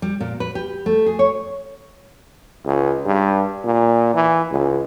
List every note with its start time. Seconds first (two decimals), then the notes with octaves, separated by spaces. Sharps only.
0.02 G3
0.20 A#2
0.40 B4
0.55 G4
0.86 A3
1.06 G#4
1.19 C#5
2.66 C#2
3.05 G2
3.64 A#2
4.14 E3
4.51 C#2